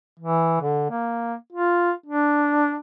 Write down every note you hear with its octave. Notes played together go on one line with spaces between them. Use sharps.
E3
D3
A#3
F4
D4